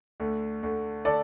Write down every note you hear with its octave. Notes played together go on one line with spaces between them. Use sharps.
D2 D3 A3
D2 D3 A3
D3 A3 A4 D5